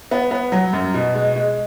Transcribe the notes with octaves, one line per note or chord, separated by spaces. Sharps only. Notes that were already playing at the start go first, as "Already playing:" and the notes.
B3
B3
F#3
F#2
B2
G#3
G#3